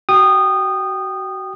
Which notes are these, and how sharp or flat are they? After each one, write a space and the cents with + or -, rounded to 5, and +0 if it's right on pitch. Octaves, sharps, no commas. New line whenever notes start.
F#4 +25 G5 +0 D#6 -20